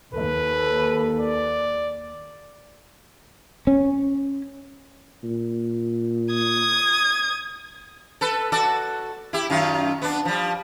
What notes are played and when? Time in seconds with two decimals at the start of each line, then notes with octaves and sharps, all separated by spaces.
0.14 D#2 A4 B4
1.20 D5
3.67 C#4
5.24 A#2
6.33 D#6 G#6
8.21 A4 B4
8.52 F#4 A4 D5
9.33 E4 G4
9.50 F#2 D#3 F4
10.02 B3 D4
10.25 F3 G3